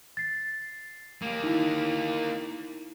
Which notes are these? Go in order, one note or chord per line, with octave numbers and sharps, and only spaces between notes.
A6 C7
A#3 G4
D#4 E4